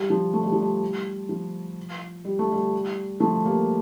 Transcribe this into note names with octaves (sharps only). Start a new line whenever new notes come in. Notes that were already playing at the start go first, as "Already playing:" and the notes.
Already playing: G3
F3
A3
G3
F3
G3
F3
G3
A3
G3
F3 A3
G3 A#3